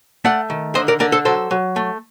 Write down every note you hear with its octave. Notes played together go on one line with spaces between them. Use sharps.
A3 D5 F#5
D#3
D3 C5 D#5
A#4 D5
D3 A#4 D5
A4 C5
F#3 A4 C5
F#3
A3